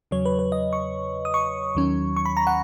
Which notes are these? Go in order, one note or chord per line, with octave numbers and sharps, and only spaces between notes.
E2 C#3 F#3 C#5
B4
B4
D#5
C#6
D#6
C#6
D#2 D#3 F#3 C#4
C#6
B5
A#5
F#5